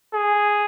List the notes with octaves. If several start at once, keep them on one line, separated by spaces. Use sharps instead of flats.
G#4